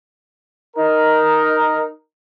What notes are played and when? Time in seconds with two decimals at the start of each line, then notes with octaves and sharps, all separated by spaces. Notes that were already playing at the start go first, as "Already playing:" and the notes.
0.76 D#4 A#4